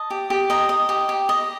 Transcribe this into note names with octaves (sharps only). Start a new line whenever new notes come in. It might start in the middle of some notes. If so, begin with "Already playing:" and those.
Already playing: D#5 A5
G4
G4
D#5 A#5
D#5
G4
G4
D#5